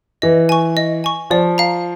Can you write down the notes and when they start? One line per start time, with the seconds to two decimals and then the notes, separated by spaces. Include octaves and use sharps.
0.22 E3 D#5
0.49 G#5 C#6
0.77 D#5
1.04 G#5 C#6
1.30 F3 D5
1.58 F5 A#5